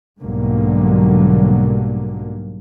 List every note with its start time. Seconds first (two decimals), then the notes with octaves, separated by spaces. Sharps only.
0.20 B1 G#2 D3 F#3 G3 A#3